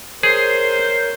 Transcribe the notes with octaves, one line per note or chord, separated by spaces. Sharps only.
G#4 A#4 C5 C#5